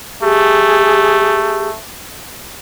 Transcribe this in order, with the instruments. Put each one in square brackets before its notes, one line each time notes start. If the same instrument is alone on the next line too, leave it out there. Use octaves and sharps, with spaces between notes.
[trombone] A3 [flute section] G4 G#4